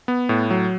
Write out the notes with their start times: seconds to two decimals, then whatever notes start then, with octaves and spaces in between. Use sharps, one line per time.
0.08 B3
0.29 A2
0.50 F#3